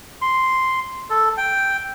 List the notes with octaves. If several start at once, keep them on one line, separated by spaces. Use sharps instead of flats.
C6
A4
G5